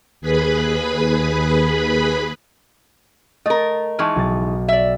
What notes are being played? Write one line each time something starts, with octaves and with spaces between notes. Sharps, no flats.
D#2 G#4 B4 B5
A3 A#4 D#5 A6
E3 G#3 D#4 A5 C#6 F6
B1 A6
D5 E5